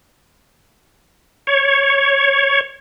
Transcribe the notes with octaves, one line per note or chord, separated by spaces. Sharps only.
C#5